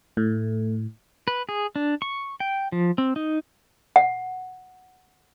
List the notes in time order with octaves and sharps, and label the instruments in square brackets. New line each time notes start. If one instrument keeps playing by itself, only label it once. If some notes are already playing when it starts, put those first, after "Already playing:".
[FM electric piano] A2 [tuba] A3
[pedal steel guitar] B4
G#4
D4
C#6
G5
F3
C4
D#4
[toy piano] F#5